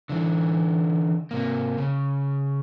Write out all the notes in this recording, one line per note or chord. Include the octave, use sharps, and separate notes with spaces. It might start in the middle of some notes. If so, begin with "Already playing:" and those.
D3 E3
C3 A#3
C#3